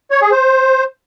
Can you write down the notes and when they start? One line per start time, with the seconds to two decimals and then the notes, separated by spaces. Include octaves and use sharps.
0.11 C#5
0.21 G#4
0.32 C5